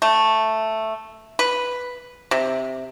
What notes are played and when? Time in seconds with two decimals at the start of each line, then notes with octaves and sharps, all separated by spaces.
0.02 A3
1.39 B4
2.31 C3